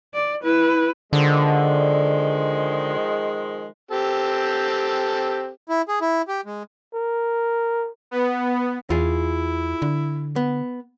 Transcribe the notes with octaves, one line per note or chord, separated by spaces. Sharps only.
D5
E4 B4
D3 D#3 F3 G#3
C4 G4 A4
E4
G#4
E4
G4
G#3
A#4
B3
E2 E4 F4 G#4
D3
B3